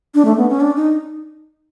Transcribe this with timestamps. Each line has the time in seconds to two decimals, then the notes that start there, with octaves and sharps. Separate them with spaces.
0.15 D4
0.25 A3
0.37 B3
0.49 C#4
0.61 D4
0.76 D#4